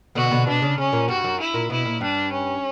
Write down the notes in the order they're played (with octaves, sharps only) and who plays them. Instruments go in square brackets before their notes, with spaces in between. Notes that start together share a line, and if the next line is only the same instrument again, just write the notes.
[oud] B2 D3 [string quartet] F#4
[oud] B2 D3
[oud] B2 [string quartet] D4
[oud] C#3
[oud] C#3 [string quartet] C#4
[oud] A#2
[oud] G2 [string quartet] F#4
[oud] F#2
[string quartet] E4
[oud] A#2
[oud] B2 [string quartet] E4
[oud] A#2
[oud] G2 [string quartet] D4
[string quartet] C#4